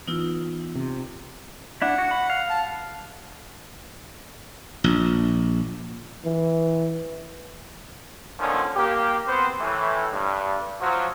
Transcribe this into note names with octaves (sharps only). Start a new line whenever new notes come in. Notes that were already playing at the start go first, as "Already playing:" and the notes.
E3 B3 D#4 F4 E6
C3
D4 E4 F#5
F#4
B5
F5
A5
A#1
E3
A#2 D3 D#3 F3 C#4
A#3 G4
B3 C4 C5
A2 E3
G2
F3 F#3